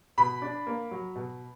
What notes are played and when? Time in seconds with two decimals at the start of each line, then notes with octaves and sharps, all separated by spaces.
0.18 B2 B5
0.42 D4
0.67 A#3
0.91 F#3
1.15 B2